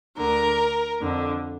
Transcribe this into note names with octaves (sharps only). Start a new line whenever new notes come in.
D2 D3 A#4
F2 D3